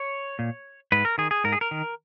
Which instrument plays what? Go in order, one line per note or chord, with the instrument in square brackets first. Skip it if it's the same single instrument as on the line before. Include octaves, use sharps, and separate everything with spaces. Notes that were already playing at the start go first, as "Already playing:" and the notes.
Already playing: [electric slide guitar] C#5
A#2
G#2 B4
A#4
D#3 G#4
G#4
G#2 A#4
G#4
A#4
D#3